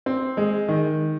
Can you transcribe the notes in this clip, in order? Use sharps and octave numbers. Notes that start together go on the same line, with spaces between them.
C4
G#3
D#3